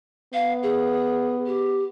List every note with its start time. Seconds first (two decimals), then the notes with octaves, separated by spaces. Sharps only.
0.34 B3 F5
0.63 G#4
1.46 G4